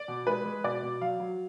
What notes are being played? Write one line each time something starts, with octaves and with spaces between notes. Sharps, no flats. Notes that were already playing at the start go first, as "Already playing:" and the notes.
Already playing: D5
B2
G#3 B4
G#3
B2 D5
B2
F#3 F5
F#3